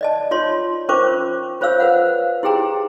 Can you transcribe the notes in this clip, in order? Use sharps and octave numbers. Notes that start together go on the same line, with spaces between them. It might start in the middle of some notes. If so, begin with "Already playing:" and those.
D5 D#5 A5
F4 C#5 C6
C#4 F4 A#4 C5 C#6 D6
F4 C5 C#5 F5 E6
B4 C5 F#5
E4 G4 G#4 G5 A#5